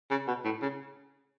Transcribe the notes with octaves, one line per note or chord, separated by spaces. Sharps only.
C#3
B2
A2
C#3